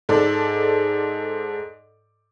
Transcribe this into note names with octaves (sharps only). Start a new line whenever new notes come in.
G#2 A4 D5